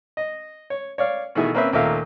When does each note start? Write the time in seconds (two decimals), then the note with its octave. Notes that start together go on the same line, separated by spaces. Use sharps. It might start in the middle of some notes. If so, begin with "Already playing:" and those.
0.17 D#5
0.70 C#5
0.98 C#5 D5 F5
1.35 B2 D#3 E3 A3 G#4 E5
1.54 A#3 C4 C#4 B4 C5 E5
1.73 D#2 A#2 A3 E5 F5 A#5